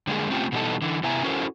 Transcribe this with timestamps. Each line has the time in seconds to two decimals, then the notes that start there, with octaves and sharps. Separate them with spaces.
0.07 D3 G3 G#3 A#3 G#4
0.30 A3 C4 C#4 F4 G4
0.52 B2 E3 G3 B3 D#4 A4
0.82 D3 E3
1.03 C3 B3 E4 E5 G#5 A#5
1.23 C#4 E4 F#4 A4 A#4 C5